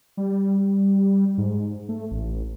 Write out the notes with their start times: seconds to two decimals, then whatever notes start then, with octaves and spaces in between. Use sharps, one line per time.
0.17 G3
1.38 G#2
1.89 A3
2.11 A1